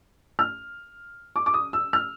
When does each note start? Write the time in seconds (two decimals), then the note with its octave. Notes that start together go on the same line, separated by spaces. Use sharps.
0.39 F6
1.36 D6
1.46 D6
1.54 D#6
1.73 E6
1.93 F6